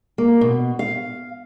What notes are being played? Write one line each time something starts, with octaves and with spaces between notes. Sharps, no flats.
A#3
B2
F5